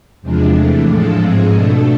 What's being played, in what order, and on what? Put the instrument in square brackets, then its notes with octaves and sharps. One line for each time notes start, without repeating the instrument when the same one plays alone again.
[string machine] E2 C3 F3 G#3 D4
F2 C3 E3 A3 D4
A2 F3 G#3 D4 A4
G#2 F3 G#3 C4 G#4
B2 A3 D4 A4